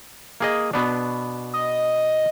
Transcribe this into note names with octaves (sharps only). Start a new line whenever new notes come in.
A#3 G#4 D#5
B2 B3 D4
D#5